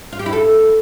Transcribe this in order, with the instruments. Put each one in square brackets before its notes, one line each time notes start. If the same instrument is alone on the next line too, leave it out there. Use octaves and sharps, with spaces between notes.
[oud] F4
G4
E4
A4